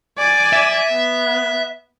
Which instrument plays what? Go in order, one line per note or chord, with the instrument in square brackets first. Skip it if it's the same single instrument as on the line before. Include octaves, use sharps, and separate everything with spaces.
[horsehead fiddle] D5 G#5
[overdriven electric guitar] E5
[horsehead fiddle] B3